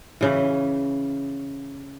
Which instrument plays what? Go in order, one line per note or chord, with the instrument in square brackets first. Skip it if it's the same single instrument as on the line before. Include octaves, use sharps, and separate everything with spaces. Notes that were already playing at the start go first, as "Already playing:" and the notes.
[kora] C#3 E3